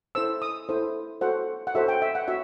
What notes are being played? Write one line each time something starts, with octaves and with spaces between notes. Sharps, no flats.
E4 A4 C5 E6
D#6
E4 A4 C5
F#4 A4 C5 F#5
F#5
F#4 A4 C5 E5
G5
E5
F#5
F#4 E5